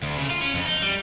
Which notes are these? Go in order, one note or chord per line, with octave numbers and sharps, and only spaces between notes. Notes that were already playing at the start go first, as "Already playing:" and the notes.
D2
C#3
F4
C#4
F2
D#4
G3